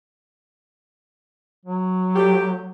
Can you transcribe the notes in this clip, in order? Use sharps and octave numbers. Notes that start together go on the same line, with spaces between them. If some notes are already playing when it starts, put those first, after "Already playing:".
F#3
G3 A3 G4